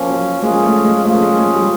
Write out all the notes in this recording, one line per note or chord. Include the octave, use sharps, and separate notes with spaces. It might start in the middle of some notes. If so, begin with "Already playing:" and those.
Already playing: F3 A#3 C#4
F#3
F3 G#3 A#3 C#4 F4 G#4
A3
G#3
F3 A3 A#3 C#4 F4 G#4
G#3
G#3
G3